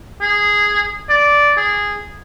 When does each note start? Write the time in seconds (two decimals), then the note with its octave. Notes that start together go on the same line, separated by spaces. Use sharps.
0.21 G#4
1.09 D5
1.57 G#4